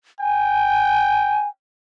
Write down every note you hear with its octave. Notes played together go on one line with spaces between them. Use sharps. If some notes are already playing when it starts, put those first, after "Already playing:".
G5 G#5